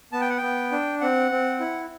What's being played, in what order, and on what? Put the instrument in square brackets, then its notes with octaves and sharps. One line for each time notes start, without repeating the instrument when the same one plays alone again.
[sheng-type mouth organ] B3 A5
G5
F#5
B3 G5
D4
C4 F#5
C4
E4